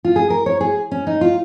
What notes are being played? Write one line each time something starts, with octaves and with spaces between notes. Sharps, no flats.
F4
G#4
A#4
C#5
G#4
C#4
D#4
F4